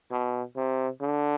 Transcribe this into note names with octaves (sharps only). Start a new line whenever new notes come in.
B2
C3
D3